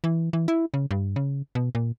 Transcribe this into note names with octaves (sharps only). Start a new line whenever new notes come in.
E3
E3
E4
C#3
G2
C#3
B2
A#2